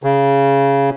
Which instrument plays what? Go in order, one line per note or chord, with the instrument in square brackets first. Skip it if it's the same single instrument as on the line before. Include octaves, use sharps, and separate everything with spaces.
[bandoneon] C#3